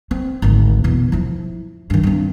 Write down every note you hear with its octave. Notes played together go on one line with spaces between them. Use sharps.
C4
G#1 D2
E2 B2
F3 E4
G2 D#3
G2 C4